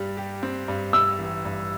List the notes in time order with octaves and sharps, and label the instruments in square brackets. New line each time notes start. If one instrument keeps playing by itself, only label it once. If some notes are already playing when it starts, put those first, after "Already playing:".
Already playing: [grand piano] G2 G3
G4
C4
G2
[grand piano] G3 [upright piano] E6
[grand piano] A1
G2